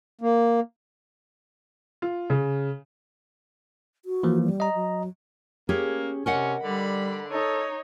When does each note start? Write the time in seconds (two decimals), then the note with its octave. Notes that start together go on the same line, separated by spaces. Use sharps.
0.21 A#3
2.02 F4
2.30 C#3
4.05 F#4
4.23 E3 F3 A#3
4.43 G3
4.60 D#5 A#5
4.74 F#3
5.69 A#3 C#4 G4 G#4
6.26 C3 C#4 A#4 D#5 F#5
6.63 D3 G3 B5
7.29 D#4 A4 C#5